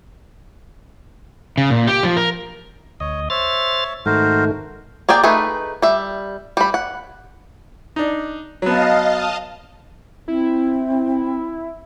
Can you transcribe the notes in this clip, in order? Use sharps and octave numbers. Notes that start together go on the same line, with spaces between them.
C#3
A#2
G4
F3
A#4
D2 C#5 D#5
C5 C#5 E5 F6 A6
G#2 D#3 A3 F#4 A#4 C5
A#3 G#4 D5 G5
A3 D#4 G#4 B4
G3 E5
G3 B5
F#5
D4 D#4
F#3 B3 D#5 F5 A5
C4 E4